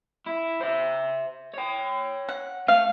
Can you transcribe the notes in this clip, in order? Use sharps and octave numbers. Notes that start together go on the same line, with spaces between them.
E4
C5 E5
C#5 G5
F#5
A3 F5